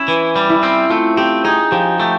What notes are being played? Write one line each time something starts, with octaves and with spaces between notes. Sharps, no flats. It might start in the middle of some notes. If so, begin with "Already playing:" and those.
Already playing: C#4 E4
E3
G3
E4
C4
A3 F4
C4 G4
D#4 G#4
F3 G4
A3 G4